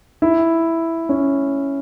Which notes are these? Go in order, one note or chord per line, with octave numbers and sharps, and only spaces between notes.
E4
C#4